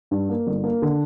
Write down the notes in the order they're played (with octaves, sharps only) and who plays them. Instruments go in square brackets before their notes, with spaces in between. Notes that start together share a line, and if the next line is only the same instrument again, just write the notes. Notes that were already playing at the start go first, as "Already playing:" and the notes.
[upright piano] G2
A#3
G1
A#3
D3